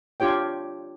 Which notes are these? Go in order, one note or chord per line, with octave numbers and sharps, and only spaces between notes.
D4 F4 G4 C#5 G5